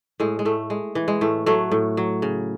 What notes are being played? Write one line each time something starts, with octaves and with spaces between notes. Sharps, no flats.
A2 G#3
G#3
A2 A3
G#3
E3
G#3
A2 A3
F#3 A3
A2
F#3
C#3